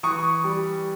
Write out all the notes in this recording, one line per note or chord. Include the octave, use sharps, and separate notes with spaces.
E3 C#6 D#6
G3